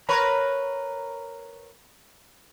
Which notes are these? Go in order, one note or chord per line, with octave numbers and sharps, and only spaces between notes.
A#4 B4 C#5 A#5 B5